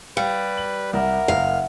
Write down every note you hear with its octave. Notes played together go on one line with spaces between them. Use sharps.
G3 B4 F5
F#7
C2 A#4 E5 F#5
F#1 F5